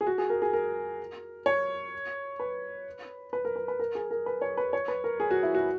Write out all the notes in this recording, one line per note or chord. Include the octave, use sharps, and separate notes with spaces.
G#4
F#4
G#4
A#4
G#4
A#4
C#5
B4
B4
A#4
B4
B4
A#4
G#4
A#4
B4
C#5
B4
C#5
B4
A#4
G#4
F#4
E4
F#4